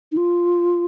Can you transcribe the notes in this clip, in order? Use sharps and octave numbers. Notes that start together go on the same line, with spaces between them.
D#4
F4